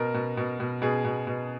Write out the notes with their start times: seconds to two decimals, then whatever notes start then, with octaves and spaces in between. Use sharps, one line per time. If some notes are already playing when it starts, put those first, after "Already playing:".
Already playing: B2 A#4
0.14 B2
0.37 B2
0.60 B2
0.82 B2 G#4
1.05 B2
1.27 B2